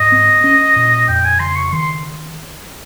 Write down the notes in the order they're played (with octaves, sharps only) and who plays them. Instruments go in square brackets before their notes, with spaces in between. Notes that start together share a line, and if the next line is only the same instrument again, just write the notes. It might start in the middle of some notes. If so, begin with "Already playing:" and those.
Already playing: [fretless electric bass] G#2 [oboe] D#5
[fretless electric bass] C4
C#4
A#2
[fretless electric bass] F2 [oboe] G5
[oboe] G#5
[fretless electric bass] C#3 [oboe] C6
[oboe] C#6
[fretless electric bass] D#3 [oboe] C6